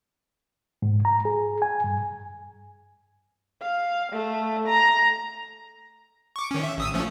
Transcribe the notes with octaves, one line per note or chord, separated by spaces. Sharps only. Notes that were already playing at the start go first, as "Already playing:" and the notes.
G#2
A#5
G#4
G#5
G2
F5
A3
A#5
C#6 D6
D#3 C#4
E5
A1 D#6 E6
F3 A3 C#4